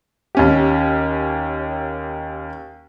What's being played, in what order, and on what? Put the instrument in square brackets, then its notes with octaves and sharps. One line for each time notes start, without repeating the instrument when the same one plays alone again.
[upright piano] D#2 C#4 G4